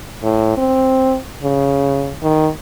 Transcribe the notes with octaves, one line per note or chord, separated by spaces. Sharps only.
A2
C4
C#3
D#3